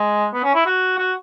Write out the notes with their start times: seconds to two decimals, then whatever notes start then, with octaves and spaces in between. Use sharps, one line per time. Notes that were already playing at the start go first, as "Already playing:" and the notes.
Already playing: G#3
0.33 B3
0.44 C#4
0.55 E4
0.67 F#4
0.98 F#4